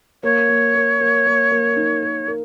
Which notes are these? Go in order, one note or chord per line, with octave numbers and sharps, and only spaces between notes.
A#3 C#5
A#3
A#4
A#3
A#3
A#3
D#4
A#4
A#4